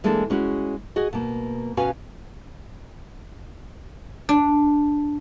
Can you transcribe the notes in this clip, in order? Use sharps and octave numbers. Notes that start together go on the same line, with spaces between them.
E3 G#3 A#3 D4 A4
G#3 C#4 E4 F#4
F#4 G#4 D#5
B2 A#3
B2 C#4 F#4 B4 F5 G#5
D4